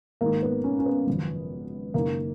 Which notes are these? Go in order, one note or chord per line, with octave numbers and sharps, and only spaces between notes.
G#1 G#2 D#3 A#3
B3
C#4
C#4
B3
G#1 F#2 C#3 F3
F#1 F#2 D#3 A#3